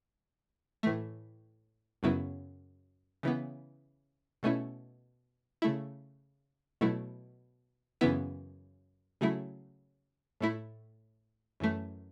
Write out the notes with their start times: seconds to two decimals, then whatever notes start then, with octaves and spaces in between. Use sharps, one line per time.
0.83 A2 E3 A3
2.03 F#2 C#3 F#3 B3 E4
3.23 C#3 E3 B3
4.43 B2 A3 C#4 E4
5.62 C#3 A3 E4
6.81 B2 F#3 A3 E4
8.01 F#2 C#3 E3 B3 E4
9.21 C#3 F#3 A3 E4
10.40 A2 A3 E4
11.60 F#2 E3 A3